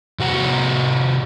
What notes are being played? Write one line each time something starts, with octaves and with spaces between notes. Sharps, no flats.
C3 F#4 F#5 A#5